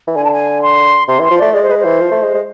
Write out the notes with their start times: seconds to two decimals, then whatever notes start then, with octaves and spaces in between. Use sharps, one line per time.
0.08 E3
0.15 D3 G#5
0.24 A5
0.32 G#5
0.62 C6
1.08 C3 C6
1.19 E3 C6
1.31 F3
1.38 A3 D5
1.54 G#3 D5
1.62 C5
1.69 G#3 B4
1.78 C5
1.85 E3
2.01 F3
2.11 A3
2.23 G#3
2.35 G#3